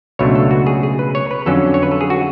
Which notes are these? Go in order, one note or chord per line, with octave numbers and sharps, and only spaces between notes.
C#2 B2 F#3 A3 D4 C#5
A4
F#4
G#4
G#4
B4
C#5
B4
F2 D3 F#3 C#4 A4
C#5
B4
A4
G#4
F#4